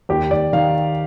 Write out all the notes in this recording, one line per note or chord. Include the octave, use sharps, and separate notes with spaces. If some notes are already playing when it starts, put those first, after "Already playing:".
D#2 G4
D#2 D5
D#3 F5